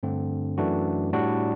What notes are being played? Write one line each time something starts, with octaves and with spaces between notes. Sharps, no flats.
G2 D3 A3 C4
F#2 E3 A3 D4 F#4
A2 G3 D4 F#4